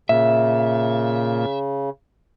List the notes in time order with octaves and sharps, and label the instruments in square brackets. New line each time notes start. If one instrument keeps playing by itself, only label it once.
[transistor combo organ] A#2 [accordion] C#3 [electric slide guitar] E5